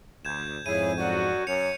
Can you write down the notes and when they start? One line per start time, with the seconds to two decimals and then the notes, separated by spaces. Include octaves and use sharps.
0.25 D2 G6 G#6 E7
0.66 F2 G#2 E4 G#4 C#5 D#7
0.99 F#2 F#3 F#4 D5
1.47 F#2 C#5 C#7 F7